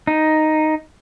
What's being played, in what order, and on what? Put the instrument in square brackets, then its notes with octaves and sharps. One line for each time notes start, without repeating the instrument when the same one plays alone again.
[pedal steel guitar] D#4